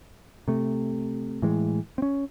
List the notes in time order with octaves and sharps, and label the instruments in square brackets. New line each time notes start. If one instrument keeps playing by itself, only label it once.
[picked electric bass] C3 A3
A2 E3 G#3
C4 C#4